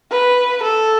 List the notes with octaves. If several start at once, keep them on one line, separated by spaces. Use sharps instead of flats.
B4
A4